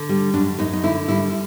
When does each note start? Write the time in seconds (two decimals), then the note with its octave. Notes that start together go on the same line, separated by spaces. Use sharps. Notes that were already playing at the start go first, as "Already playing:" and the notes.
Already playing: D3
0.09 G3
0.34 F#2 D4
0.59 F#2 D#4
0.73 D#4
0.83 D3 E4
1.08 G3 E4